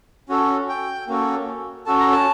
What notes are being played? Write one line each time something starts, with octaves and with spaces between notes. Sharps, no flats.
C#4 F#4 A4
G5
A#3 C#4 F#4 A4
C#4 F#4 A4 A5
A#5
A5